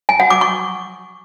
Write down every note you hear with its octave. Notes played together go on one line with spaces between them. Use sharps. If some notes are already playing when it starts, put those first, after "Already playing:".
G#5
F#5
D6
C#6